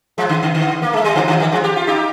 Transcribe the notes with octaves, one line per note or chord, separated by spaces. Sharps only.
F3 G#3
D3
D3
D3
A#3
G#3
G3
D3 F3
D3 F3
D#3 G3
F3 G#3
G4
F4
D#4 G4